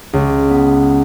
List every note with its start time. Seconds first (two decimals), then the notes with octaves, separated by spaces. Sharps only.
0.13 C#2
0.50 B3